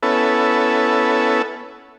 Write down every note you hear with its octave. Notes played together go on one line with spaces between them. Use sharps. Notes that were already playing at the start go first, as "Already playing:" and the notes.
B3 C#4 E4 A4